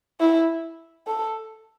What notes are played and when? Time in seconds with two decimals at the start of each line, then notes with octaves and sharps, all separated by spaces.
0.20 E4
1.07 A4